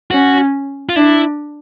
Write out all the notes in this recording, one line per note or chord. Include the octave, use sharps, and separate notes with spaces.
C#4 F#4
F4
D4 E4